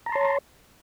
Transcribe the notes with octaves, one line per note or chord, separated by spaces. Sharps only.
C#5 A5 A#5 C6